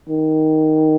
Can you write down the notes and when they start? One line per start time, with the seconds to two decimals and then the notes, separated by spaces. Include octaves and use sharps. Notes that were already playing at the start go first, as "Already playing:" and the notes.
0.09 D#3